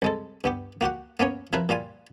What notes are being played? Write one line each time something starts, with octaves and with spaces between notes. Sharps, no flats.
C2 G#3 A4
G2 B3 G4
A#3 F#4 G4 F#5
A#3 B3 C#4 C#5
C3 F3 E4 A#4 B4
A#2 G3 F4 G#5